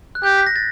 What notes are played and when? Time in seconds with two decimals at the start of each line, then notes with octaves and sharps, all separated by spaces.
0.15 F#6
0.23 G4 G6
0.38 B6
0.46 A#6
0.56 A6